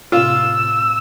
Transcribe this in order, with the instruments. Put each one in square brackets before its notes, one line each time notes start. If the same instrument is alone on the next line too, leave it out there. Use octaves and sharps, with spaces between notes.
[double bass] A2 C3 [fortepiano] F4 [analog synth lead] E6